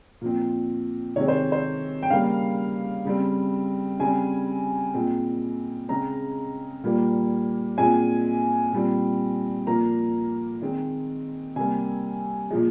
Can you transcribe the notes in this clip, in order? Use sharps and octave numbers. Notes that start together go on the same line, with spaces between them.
A#2 F3 C4
C3 D#3 G#3 C4 C#5
C5
C5
G5
C#3 G3 A#3 F5
C#3 G3 C4
C#3 G3 C4 G#5
A#2 G#3 C4
C#3 G#3 C4 A#5
A#2 G3 A#3
A#2 G#3 C4 G#5
A#2 G3 C4
A#2 F3 A#3 A#5
D#3 G#3 C4
C3 G3 A#3 G#5
A#2 F3 G#3